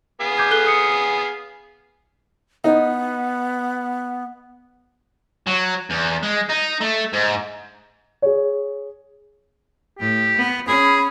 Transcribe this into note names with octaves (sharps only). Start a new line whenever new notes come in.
B3 G#4 F5
D6 G6 G#6
A4 F#6 G7
D#6 C#7
B3 D#4
F#3
E2
G#3
D#4
A3
G#2
G#4 C#5
A2 G4
B3
C#4 G#4 B5